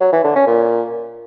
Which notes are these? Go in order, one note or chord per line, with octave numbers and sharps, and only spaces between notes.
F#3
E3
D3
C#4
A#2